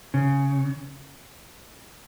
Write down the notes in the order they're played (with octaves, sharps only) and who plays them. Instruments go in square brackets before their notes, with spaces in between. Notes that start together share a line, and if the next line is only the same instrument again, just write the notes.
[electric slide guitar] C#3